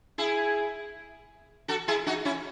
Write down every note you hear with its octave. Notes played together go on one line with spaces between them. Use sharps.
E4 G#4
F#4 A4
E4 G#4
D#4 F#4
C#4 E4